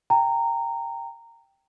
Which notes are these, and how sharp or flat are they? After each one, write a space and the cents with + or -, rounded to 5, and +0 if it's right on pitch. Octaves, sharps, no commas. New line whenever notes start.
G5 +0 A#5 -15